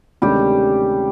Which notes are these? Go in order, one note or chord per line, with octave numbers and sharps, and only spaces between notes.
D2 C3 D#3 G3 G#3 C#4 G4